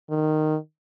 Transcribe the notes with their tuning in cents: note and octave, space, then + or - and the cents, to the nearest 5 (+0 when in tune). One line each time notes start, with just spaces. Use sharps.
D#3 -10